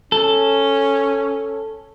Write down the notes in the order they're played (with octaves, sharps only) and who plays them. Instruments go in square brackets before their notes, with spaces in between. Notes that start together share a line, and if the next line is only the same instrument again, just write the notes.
[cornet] C#4 [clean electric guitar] A4